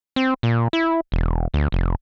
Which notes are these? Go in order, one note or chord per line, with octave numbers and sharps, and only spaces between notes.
C4
A#2
E4
E1
D2
F1